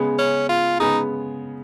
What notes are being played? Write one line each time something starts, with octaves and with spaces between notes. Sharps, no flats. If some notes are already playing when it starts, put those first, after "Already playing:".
Already playing: C#3 G#3 B3
C#4
F4
C#3 G#3 B3 D#4